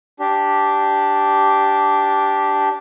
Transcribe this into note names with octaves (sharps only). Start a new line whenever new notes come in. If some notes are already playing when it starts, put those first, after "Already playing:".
D4 G4